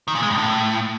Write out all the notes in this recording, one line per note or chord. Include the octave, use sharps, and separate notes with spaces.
D#3
A#2
G#3
G2
A2